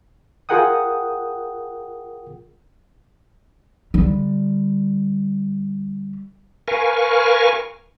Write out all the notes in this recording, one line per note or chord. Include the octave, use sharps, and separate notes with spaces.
F4 G#4 A#4 F#5 G5 D#6
D3 G3
A#4 B4 F5 G#5 C#6